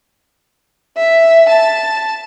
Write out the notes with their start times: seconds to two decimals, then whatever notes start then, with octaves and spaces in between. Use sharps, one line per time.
0.97 E5
1.49 A5